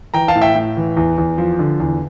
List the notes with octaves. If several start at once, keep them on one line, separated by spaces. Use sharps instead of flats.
E3 G5 A#5
F5 A5
A2
E5 G5
A2
E3
E2
E2
F3
D3
E2